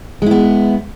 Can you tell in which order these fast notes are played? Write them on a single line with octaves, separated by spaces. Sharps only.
G#3 E4 B3